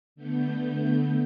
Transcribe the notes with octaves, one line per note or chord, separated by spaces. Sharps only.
D3 A3 B3 G6